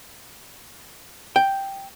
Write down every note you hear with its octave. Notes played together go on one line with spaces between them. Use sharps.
G5